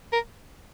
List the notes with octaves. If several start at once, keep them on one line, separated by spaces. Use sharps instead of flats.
A#4